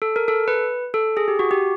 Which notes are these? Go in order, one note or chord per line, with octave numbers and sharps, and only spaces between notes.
A4
A#4
A4
B4
A4
G#4
G4
F#4
G4